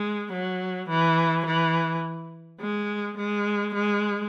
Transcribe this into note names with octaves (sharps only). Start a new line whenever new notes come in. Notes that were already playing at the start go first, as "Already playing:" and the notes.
Already playing: G#3
F#3
E3
E3
G#3
G#3
G#3